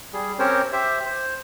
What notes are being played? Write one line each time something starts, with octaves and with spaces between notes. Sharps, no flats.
G3 G#4
C4 C#4 G4 A#4 C5 C#5
G4 C5 E5
C5